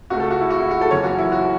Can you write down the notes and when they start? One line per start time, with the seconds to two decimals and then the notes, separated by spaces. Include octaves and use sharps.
0.10 C#2 C#3 A3 F#4
0.20 A4
0.31 F#4
0.40 E4
0.50 F#4
0.60 E4
0.71 F#4
0.81 A4
0.91 F#1 F#2 E3 C#4 C#5
1.04 F#4
1.18 E4
1.32 F#4